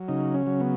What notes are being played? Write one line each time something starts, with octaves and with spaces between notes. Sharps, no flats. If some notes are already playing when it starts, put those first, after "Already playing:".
Already playing: F#3
C#3 D#4
C#4
F#3
B3